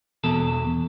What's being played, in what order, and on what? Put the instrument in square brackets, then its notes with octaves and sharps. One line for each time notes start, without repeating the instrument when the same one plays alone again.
[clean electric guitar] E2 B2 A4